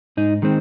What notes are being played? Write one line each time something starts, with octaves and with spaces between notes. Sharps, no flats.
G#2 D#4
D#3 G#3 C4